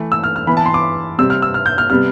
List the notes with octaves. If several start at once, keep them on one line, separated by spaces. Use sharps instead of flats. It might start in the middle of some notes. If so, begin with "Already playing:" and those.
Already playing: E3 A3
E6
F6
F6
E3 B3 B5
A5
C6
D6
C3 G3 C4 E6
F6
E6
F6
G6
F6
C3 G3 B3 F6